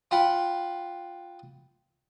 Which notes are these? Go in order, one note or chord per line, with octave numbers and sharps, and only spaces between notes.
F4 F#5 G5 B5